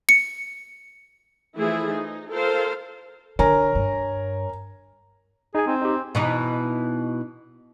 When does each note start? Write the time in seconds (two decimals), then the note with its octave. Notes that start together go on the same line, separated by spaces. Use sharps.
0.09 C#7
1.56 E3 F3 A3 E4 G#4
1.90 D#4
2.31 F4 A4 A#4 C5 F5
3.39 D3 A#4 C#5 G#5 A#5
3.75 G2
5.55 D#4 G#4 G#5
5.67 C4
5.82 D#4 G4
6.15 B2 E3 D#4